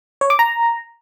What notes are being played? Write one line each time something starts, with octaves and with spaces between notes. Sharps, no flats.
C#5
D6
A#5